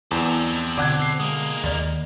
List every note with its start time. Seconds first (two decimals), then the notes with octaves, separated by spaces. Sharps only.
0.11 E2 C4 E4 A4 A5 D6
0.78 B2 D3 D5 F#5 A5 D6 F#6 G#6
1.02 C7
1.20 G#3 A#3 D#6
1.64 D#2 D5 D#5